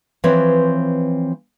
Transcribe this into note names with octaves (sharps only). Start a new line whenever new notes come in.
E3 F3 C4 B4 C#5